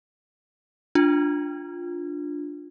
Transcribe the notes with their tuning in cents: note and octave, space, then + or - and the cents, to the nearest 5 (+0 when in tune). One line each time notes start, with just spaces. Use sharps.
D4 +0 F4 +10